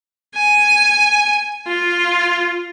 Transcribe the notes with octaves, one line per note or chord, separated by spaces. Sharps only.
G#5
F4